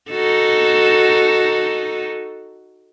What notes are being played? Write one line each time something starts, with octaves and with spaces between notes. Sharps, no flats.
D#4 F#4 A4